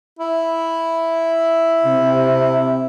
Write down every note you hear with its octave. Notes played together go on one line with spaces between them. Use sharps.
E4
C3